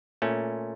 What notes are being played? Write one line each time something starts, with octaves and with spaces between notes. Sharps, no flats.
A#2 A3 C#4